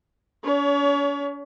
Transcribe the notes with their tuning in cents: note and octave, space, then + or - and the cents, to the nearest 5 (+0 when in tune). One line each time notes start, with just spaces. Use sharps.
C#4 +45 C#5 +30